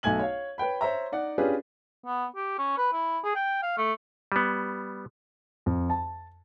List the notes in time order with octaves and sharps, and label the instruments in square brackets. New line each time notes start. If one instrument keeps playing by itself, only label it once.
[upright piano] B1 A3 G#5 G#6 F#7
C#5 F5
B4 C#5 G5 B5
C5 C#5 E5 A#5
D#4 D5 F#5
C#4 D4 F4 G4 G#4 B4
[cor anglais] B3
G4
C#4
B4
E4
G#4
G5
F5
A3
[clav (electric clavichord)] G3 B3
[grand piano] F2
A5